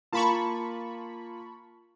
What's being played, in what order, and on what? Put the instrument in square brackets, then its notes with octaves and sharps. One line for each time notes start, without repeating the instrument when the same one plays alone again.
[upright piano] A#3 F4 [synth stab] A5 B5 C#6